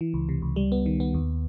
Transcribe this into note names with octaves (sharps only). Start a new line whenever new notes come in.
E3
C#2
C3
C#2
G3
B3
D#3
B3
D#2